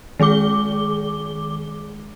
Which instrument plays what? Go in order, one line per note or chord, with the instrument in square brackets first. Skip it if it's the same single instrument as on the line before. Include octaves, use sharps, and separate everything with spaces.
[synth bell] D#3 G#3 G#4 D6 G7